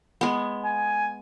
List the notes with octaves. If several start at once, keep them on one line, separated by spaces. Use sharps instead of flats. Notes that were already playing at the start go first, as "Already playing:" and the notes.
G#3 B3
G#5